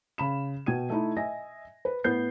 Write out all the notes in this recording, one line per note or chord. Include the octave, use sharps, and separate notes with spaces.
C#3 B5 E7
B2 G5 G#6 D#7
A3 D#4 E4
D#5 E5 G#5 A#6
B4
A2 B3 G6 C7